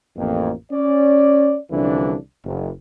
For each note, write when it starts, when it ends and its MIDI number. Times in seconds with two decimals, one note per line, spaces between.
0.17 0.52 33
0.17 0.52 41
0.17 0.52 58
0.72 1.58 61
0.72 1.58 74
1.71 2.15 36
1.71 2.15 50
1.71 2.15 52
1.71 2.15 53
1.71 2.15 61
1.71 2.15 62
2.44 2.70 30